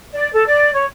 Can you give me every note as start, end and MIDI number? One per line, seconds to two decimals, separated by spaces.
0.13 0.29 74
0.33 0.46 69
0.46 0.70 74
0.73 0.85 73